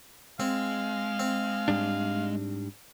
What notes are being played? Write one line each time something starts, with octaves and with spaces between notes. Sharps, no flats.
G#3 C4 F5
C4
G#2 G3 D4